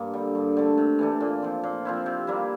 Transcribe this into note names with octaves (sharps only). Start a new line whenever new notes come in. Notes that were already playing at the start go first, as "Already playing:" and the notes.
Already playing: G2 A#3
D3 G3
G2
D3 A3
C3
E3 A3 D4
A#2
F3 C4
A#2
F3 C4 E4
C3
G3 A#3 E4